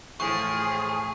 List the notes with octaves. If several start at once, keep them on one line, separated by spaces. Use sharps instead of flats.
A2 E3 F3 G#4 C#6